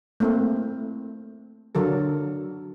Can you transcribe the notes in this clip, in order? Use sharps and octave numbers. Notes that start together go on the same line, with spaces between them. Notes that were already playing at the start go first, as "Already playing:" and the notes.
A3 A#3 C4 E4
D3 F#3 A4 A#4